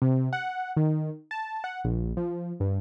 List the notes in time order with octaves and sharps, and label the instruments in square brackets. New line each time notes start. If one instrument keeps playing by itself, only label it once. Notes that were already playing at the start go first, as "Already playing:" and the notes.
[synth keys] C3
F#5
D#3
A5
F#5
A#1
F3
G2